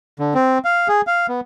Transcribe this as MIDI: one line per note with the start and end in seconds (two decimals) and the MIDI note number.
0.19 0.34 50
0.34 0.58 60
0.65 0.88 77
0.88 1.01 68
1.07 1.26 77
1.28 1.40 59